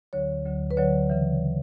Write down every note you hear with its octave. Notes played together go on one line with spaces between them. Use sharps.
D2 D3 F#3 C#5
D2 D3 F#3
B4
D2 D3 F#3 C#5
C#3 E3